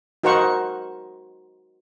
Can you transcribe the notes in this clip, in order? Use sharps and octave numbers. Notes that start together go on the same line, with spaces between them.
D#4 F#4 A#4 C5 F#5 C#6